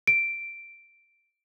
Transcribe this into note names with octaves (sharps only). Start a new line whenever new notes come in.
D7